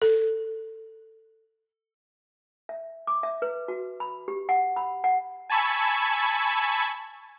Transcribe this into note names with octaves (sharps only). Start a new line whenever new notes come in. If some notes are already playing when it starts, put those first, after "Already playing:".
A4
E5
D6
E5
B4
F#4
B5
G4
F#5
B5
F#5
G#5 A5 B5 C#6 E6 G#6